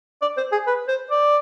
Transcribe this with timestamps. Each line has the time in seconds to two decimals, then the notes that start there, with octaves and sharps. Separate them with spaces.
0.22 D5
0.38 C5
0.52 G#4
0.67 B4
0.88 C5
1.11 D5